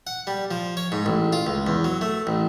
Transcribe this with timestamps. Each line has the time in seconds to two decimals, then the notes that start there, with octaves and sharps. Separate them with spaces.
0.07 F#5
0.27 G3
0.51 F3
0.77 C#5
0.92 G#2
1.06 A1
1.33 F4
1.47 C#2
1.67 E2
1.84 F#3
2.01 A3
2.27 A1